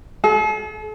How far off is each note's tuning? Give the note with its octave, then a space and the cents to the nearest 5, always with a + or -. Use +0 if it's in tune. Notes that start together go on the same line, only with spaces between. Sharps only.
A4 -45